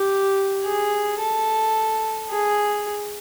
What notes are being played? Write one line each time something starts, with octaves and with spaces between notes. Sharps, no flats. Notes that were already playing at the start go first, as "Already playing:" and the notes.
Already playing: G4
G#4
A4
G#4